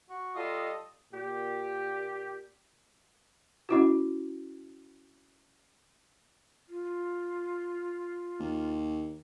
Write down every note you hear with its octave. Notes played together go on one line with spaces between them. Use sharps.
F#4
G3 F4 A4 D#5
A#2 G4
C#4 E4 F#4
F4
D#2